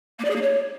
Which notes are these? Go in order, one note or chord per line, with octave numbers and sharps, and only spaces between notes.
A#3
D5
G#4
A#3
C#5